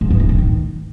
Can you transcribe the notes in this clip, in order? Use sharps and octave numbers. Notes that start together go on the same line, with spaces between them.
G#2
E2
G2
A2
D#3